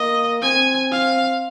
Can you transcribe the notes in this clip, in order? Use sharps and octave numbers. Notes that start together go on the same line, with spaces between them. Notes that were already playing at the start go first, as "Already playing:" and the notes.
Already playing: A#3 D#5
C4 G#5
F5